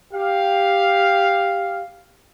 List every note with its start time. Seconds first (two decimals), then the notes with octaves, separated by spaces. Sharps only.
0.13 G4 F5